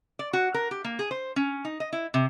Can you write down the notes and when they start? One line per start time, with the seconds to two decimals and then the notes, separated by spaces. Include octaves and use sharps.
0.19 D5
0.33 F#4
0.54 A#4
0.71 G4
0.85 A#3
0.99 G#4
1.11 C5
1.36 C#4
1.65 D#4
1.80 D#5
1.93 E4
2.14 C3